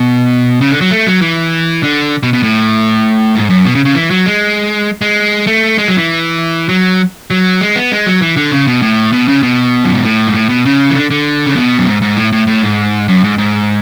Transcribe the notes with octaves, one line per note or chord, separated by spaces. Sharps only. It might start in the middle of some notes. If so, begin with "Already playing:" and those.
Already playing: B2
C#3
D3
F#3
A3
F#3
E3
D3
B2
B2
A2
G#2
F#2
B2
C#3
C#3
E3
F#3
G#3
G#3
A3
G#3
F#3
E3
F#3
F#3
G#3
B3
G#3
F#3
E3
D3
C#3
B2
A2
B2
C#3
B2
F#2
G#2
A2
G#2
A2
B2
C#3
E3
D3
D3
C#3
B2
F#2
G#2
G#2
A2
A2
A2
G#2
F#2
G#2
G#2